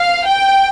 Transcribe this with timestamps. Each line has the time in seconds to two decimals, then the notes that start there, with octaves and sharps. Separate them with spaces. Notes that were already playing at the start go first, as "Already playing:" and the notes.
Already playing: F5
0.28 G5